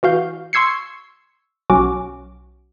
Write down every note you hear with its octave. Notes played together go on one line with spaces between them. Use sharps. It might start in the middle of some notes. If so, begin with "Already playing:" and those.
E3 F#4 F5 G6
C6 C#6 E6 G#6 C7 C#7
B1 C#4 F#4 D6